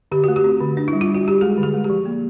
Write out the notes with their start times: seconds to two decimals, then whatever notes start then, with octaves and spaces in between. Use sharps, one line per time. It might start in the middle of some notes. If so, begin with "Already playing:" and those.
0.12 D3 G4
0.24 A3 F#4
0.36 G4
0.44 C4
0.60 D3
0.77 D4
0.88 E4
0.93 G3
1.01 F4
1.08 G3
1.14 F#4
1.25 G3 G4
1.41 G#3 G#4
1.58 D3
1.63 G#4
1.74 G#3
1.84 G4
1.90 F3
2.06 A#3